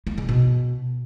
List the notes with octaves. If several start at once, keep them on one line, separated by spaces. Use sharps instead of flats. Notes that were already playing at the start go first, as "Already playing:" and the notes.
A#3
C#3
B2